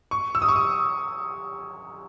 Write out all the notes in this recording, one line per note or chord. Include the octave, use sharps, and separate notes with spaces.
C#6
E6
D#6
C#6
D#6